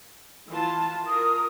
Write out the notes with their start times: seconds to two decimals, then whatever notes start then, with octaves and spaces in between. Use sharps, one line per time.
0.49 E3 F4 A5
1.07 F4 A#4 D#6